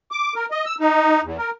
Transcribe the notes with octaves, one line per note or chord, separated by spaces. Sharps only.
D6
A#4
D#5
E6
D#4
E2
A#4